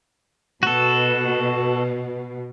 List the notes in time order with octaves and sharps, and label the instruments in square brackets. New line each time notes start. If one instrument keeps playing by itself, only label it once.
[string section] B2 [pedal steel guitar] F#4 A4